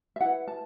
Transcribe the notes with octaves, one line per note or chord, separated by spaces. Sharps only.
E5
E4 B4 F#5
A5